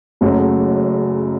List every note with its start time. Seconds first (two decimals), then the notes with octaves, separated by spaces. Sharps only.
0.21 F#1 F#2 C#3 F#3 A3